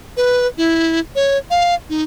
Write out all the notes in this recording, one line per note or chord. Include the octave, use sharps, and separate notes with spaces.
B4
E4
C#5
F5
D#4